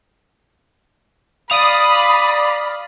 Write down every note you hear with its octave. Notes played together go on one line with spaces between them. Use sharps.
D5 F5 B5 D#6